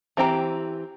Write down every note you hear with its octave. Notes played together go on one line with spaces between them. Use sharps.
E3 C4 G4 A#5